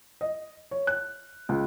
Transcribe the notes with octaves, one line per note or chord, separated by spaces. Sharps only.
D#5
C#5
F#6
C#2